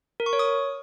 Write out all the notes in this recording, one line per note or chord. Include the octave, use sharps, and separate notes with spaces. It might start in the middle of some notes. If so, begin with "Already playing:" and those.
A#4
C#6
C#5
D#6